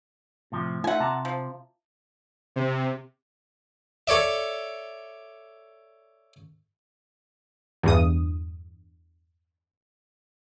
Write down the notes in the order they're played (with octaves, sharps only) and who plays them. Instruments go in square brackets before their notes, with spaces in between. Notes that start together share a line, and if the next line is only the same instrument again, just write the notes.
[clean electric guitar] A2 C3 F3
[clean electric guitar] A3 D#4 [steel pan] F4 E5 [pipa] F#5 G#5
[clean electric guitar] C3 [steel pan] A5 A#5
[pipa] F3
[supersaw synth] C3
[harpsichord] A4 C#5 D5 E5
[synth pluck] E2 G2 D#6